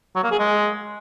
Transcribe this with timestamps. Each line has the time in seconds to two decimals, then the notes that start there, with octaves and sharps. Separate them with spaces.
0.16 F#3
0.23 A#3
0.31 G#4
0.39 G#3